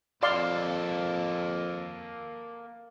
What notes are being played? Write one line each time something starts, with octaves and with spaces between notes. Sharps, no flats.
F2 A#3 A4 D5 F5 C6